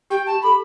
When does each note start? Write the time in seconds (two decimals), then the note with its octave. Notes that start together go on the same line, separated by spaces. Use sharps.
0.10 G4 G5
0.26 G4 A5
0.41 A4 B5